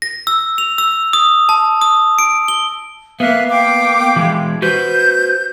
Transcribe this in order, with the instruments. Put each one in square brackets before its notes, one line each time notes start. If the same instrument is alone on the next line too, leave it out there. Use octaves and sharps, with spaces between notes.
[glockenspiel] A#6
E6
F7
E6
D#6
A5
D#6
D7
G7
[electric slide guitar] A#3 B3 [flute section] E5 F5 F#6
[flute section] F5 G5 D6
[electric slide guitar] E3 G#3
[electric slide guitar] F#4 B4 C5 [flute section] G6